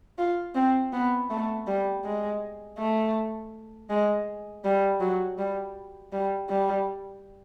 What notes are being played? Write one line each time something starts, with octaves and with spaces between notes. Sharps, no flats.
F4
C4
B3
A3
G3
G#3
A3
G#3
G3
F#3
G3
G3
G3